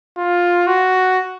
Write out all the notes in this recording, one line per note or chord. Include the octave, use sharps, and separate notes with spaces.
F4
F#4